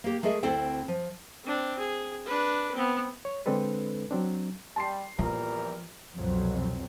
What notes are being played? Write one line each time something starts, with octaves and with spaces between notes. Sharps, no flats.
A#3 G4
G#3 A3 G#4 A#4 D#5 E5
D2 C4 E4 A4 D5 G5
F3
C4 D4
G#4
D4 B4
B3 C4
C#5
D3 G#3 C4 D4 A4 B4
F#3 C4 D4
G3 A5 C6 C7
A#1 E2 F3 G3 A#4
C2 F2 B2 F#3 C4